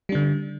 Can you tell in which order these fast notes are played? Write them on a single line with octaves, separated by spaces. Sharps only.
G3 D4 D3